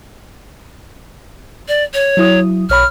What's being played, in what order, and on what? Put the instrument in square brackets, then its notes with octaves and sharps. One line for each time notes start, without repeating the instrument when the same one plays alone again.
[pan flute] D5
C#5
[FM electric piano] F#3 E4 D#6
[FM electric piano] B1 C#5 B5 [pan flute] F6